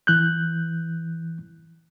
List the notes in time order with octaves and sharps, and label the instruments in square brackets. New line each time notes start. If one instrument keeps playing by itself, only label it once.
[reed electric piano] E3 F#6 G6